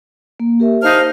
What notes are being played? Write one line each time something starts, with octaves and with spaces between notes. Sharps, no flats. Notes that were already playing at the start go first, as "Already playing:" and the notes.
A#3
G4 A#4 E5
D#4 C5 F5 A5 F6